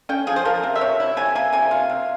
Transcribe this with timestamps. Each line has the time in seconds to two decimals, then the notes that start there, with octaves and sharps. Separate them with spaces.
0.09 C#4 G5
0.27 F3 G#4
0.36 C5
0.45 F3 A#4
0.63 C3
0.76 E5
0.81 C3 C#5
1.00 E4
1.17 C3 G#5
1.35 A#3 G#5
1.53 C3 G#5
1.71 F4
1.90 C3